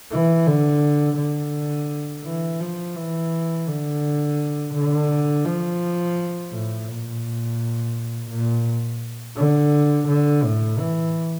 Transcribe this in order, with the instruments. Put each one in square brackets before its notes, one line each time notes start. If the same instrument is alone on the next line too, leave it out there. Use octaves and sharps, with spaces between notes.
[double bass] E3
D3
D3
E3
F3
E3
D3
D3
F3
A2
A#2
A#2
D3
D3
A2
E3